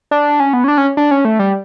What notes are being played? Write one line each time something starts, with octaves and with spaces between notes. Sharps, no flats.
D4
C#4
B3
C#4
D4
C#4
D4
C#4
A3
G3